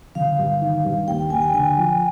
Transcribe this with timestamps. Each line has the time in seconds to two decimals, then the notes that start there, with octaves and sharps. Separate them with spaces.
0.15 G1 F5
0.38 G2
0.62 D#3
0.85 G2
1.07 D#2 G5
1.18 G5
1.30 D#2 G#5
1.42 G5
1.54 D3 G#5
1.77 F3